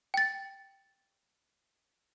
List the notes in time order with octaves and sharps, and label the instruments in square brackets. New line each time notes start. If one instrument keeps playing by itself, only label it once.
[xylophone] G5 A6